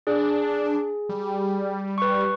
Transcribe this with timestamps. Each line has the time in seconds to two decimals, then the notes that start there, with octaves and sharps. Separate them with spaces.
0.07 D4 G#4
1.09 G3
1.98 B4 C#6